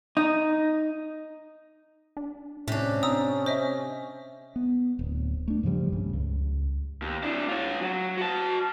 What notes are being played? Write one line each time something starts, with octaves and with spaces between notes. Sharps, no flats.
D#4
D4
A2 C3 C#4 D4
C4 A#5 D#6 E6
C5 D#5 E5
B3
D1
A3 D4
G2 C#3 F3 G3
B1 G2 C#3
C#2
D#2
D4 E4
F4 C#5
F#3
F#4 A5